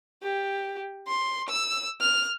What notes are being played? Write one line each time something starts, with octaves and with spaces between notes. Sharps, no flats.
G4
C6
E6
F6